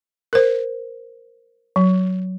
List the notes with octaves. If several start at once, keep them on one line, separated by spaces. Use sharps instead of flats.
A#4 C5
F#3